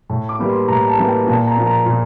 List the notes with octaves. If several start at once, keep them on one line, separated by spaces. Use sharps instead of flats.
A2
D6
E3 G3 A#3
C6
A2 A#5
A5
E3 G3 A#3
G5
A#2 A5
A#5
F3 A#3
A#5
A#2